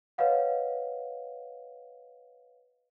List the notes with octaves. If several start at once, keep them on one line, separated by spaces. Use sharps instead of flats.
B4 C#5 D#5 F5 F#5